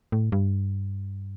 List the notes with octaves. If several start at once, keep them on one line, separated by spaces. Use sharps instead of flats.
A2
G2